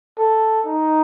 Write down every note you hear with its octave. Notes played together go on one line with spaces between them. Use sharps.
A4
D#4